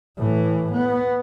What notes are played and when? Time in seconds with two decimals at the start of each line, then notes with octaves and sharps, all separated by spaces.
0.17 A2 E3
0.72 B3